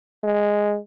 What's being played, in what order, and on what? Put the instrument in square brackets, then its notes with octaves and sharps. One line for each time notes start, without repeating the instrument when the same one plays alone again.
[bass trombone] G#3